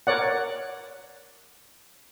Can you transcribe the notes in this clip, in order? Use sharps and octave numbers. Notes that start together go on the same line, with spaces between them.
A#4 C#5 D5 F#5